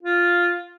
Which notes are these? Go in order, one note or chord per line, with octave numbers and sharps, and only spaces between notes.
F4